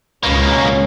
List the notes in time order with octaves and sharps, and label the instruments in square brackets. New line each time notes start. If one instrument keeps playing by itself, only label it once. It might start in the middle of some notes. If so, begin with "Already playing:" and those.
[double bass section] C#2 C#4 [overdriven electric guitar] B2 A#3